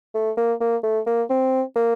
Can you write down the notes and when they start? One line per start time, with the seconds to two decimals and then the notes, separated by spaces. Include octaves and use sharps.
0.15 A3
0.37 A#3
0.61 A#3
0.83 A3
1.06 A#3
1.30 C4
1.76 A#3